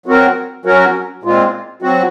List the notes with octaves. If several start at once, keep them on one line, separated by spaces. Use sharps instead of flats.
F#3 C4 F#4 A#4
F#3 C#4 F#4 A#4
A#2 G#3 C4 F4
F#3 C4 F#4